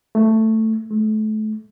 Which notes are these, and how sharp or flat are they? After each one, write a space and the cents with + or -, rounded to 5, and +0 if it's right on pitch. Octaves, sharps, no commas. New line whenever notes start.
A3 +10
A3 -30